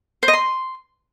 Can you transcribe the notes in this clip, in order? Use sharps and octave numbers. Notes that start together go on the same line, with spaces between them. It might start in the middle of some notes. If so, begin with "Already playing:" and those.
C5
D#5
C6